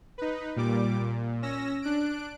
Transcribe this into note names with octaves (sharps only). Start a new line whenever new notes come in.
D#4 B4
A#2 G3 D6
A#2
C#4 E6 A#6
D4 F#6 D7